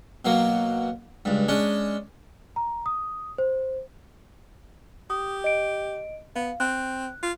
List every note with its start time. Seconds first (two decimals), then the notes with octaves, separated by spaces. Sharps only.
0.25 B2 F#3 A#3
1.25 C#2 G2
1.48 G#3 C#4 D4
2.56 A#5
2.86 D#6
3.38 C5
5.10 G4 D#6
5.44 D#5 D7
6.36 B3 F5
6.60 C4 F#6
7.23 F4